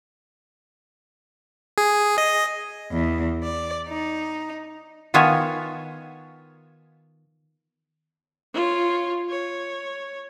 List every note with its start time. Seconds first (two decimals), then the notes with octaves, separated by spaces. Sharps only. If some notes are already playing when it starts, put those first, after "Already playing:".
1.78 G#4
2.18 D#5
2.92 E2
3.42 D5
3.87 D#4
5.14 D#3 B3 F4 C#5 E5 G#5
8.54 F4 C#5
9.29 C#5